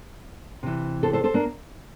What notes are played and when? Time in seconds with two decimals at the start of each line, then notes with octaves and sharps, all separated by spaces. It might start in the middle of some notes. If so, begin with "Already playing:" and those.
0.63 C3 E3
1.03 A4 C5
1.13 A4 C5
1.24 A4 C5
1.34 A#3 D4